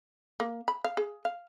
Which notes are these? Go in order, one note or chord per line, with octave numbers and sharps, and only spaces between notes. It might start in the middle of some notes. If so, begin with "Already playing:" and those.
A#3
B5
F5
G#4
F5